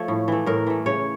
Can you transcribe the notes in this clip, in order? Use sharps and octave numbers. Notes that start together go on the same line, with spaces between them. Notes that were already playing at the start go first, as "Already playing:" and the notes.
Already playing: F3 A3 C#5
A2
E3 A3
A2 A#4
E3 A3
C#3 C#5